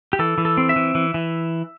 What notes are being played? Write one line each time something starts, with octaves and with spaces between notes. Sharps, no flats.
G4
E3 A4
E3
A4
C4
E5
E3
E3
E3